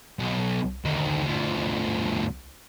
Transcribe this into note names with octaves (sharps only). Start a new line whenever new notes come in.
B1
D2 D#3
D2 F3